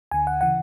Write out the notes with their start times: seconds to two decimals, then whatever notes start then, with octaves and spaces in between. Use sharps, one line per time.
0.11 D2 D3 G#5
0.27 F#5
0.41 C#3 E3 F#5